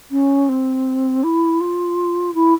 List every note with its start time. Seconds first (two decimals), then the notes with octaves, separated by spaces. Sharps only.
0.11 C#4
0.49 C4
1.23 E4
1.60 F4
2.34 E4